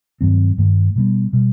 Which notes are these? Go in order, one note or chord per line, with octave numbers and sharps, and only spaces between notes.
G2 D#3 F#3 C4
G2 D#3 A3
B2 G3 B3
B2 G3